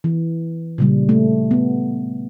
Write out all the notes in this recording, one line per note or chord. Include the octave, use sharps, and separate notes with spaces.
E3
A#2 C#3 G3
A3
B3